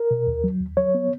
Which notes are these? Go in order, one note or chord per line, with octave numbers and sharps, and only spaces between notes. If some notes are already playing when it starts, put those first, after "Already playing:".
Already playing: A#4
B2
D#2
F#3
D#2
F#3 C#5
B3